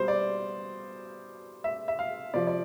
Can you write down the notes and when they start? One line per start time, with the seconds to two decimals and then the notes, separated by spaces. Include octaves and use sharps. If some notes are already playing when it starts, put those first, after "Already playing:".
Already playing: B2 G3 C5
0.08 D5
1.64 E5
1.88 E5
1.99 F5
2.34 C3 F3 D5
2.47 D5